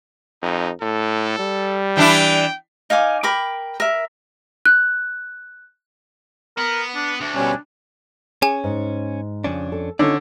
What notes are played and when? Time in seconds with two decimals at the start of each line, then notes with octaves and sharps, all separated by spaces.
0.42 F2 D#4
0.82 A2 A4
1.39 G3
1.97 E3 D4 E4 G5
2.90 D#4 F5 G#5 D6
3.23 A#4 G5 B5 D6
3.80 A#4 E5
4.66 F#6
6.58 B3 A#4
6.95 D4
7.20 D2 D4
7.35 B2 G3 C#4
8.42 C#4 G#4 G#5
8.64 G#2
9.44 F2 C#3 C#4 D4
9.72 A4
9.99 D3 C#4 D#4 F4 C#5 D5